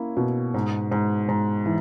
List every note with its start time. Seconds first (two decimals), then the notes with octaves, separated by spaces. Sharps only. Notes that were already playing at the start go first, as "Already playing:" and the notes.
Already playing: A#3 C#4 E4
0.17 B2
0.54 G#2
0.91 G#2
1.29 G#2
1.65 E3